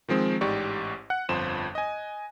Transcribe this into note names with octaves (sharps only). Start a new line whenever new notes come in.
D#3 F3 G#3 C4
A1 G#2 G4 D5 C#6
F#5 F#6
G1 F2 F3 C5 E7
D#5 G#5